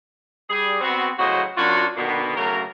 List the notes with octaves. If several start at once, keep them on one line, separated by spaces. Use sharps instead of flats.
G3 G#4
B3 C4 F#4
A2 C#3 F#3 F#4 C5 D#5
F#2 F#3 D4 F4 F#4
B2 D3 D#3 A#3 B3
C#3 F#3 A3 A#3 A#4